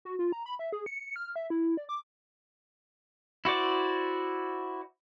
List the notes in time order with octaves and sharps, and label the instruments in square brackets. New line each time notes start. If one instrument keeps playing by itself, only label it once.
[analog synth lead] F#4
F4
A#5
B5
E5
G#4
C#7
F6
E5
E4
D5
D6
[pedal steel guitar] E4 F#4 C5 D5